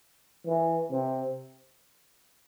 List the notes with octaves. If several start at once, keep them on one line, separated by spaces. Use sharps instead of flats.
E3
C3